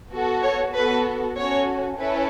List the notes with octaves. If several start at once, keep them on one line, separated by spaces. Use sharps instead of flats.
B3 F#4 A4
C#5
B3 F#4 A4 B4
C#4 F#4 A4 C#5
C#4 E4 A4 B4